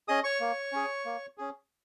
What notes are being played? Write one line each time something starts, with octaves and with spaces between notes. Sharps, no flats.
C#4 G#4 D#5 D#6
C#5 C#6
A#3
C#4 G#4
A#3
C#4 G#4